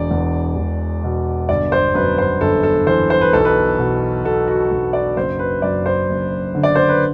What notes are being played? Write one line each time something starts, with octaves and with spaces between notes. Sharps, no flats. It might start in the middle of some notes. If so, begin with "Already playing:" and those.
Already playing: E1 D5
E2
E1
B2
G1 D5
C5
F#2 B4
C5
G1 A4
A4
E3 C5
C5
B4
B1 A4
B4
B2
B2 A4
F#4
B1
D5
F#1 C5
B4
F#2 D5
C5
F#1
D3
D5
C5
B4